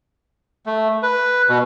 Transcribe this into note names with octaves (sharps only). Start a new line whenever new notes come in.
A3
B4
B2